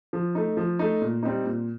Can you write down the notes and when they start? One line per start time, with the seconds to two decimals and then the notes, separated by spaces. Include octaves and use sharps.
0.13 F3
0.35 A3 D#4
0.57 F3
0.79 A3 D#4
1.02 A#2
1.23 G3 C4 D#4
1.45 A#2